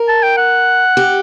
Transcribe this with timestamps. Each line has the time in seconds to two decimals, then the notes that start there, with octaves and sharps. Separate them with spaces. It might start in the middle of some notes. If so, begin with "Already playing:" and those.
Already playing: A#4
0.08 A5
0.23 G5
0.38 F#5
0.97 G4